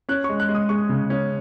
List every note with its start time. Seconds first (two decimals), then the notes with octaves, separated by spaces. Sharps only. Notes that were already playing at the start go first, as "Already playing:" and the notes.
0.09 C#4 F#6
0.24 G#3 C#6
0.40 F#6
0.49 G#3
0.55 D#6
0.69 G#3 C#6
0.89 C#3
1.10 C#4